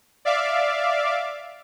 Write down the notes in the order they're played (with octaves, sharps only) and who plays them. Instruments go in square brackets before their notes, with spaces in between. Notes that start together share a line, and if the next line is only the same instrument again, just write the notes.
[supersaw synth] D5 E5 F5 D6